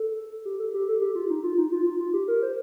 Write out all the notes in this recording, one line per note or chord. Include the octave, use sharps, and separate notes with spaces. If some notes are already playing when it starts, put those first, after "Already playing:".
Already playing: A4
G4
A4
G4
A4
G4
F4
D#4
F4
D#4
F4
F4
F4
G4
A#4
C5